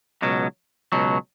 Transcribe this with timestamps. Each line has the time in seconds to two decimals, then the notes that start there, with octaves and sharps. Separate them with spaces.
0.22 C#2 B2 F#3
0.92 C#2 B2 F#3